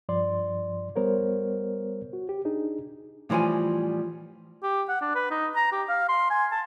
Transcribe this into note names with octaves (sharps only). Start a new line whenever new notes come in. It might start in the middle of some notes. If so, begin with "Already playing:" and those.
G2 F3 D5 C6
G3 B3 A#4 C5 C#5
F#4
G4
D4 D#4 G#4
A2 E3 F3 G3 G#5
G4
F#5
D4
B4
D#4
A#5
G4
F5
C6
G#5
A5